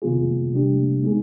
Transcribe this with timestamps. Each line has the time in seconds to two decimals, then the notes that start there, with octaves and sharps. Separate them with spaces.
0.02 C3 D#3 B3 F4 G#4
0.52 C3 G3 D4 G4
1.03 G#3 B3 D#4 G#4